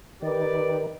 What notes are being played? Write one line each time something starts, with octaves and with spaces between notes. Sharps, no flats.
D#3 G4 B4 D5